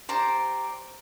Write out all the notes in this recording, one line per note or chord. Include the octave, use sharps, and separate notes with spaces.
G4 C5 D5 A#5